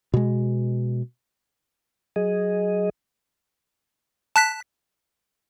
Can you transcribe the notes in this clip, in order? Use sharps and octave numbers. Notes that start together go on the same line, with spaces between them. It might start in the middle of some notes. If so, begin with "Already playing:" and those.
B2 G#3
F#3 G#4 D#5
A5 F#6 B6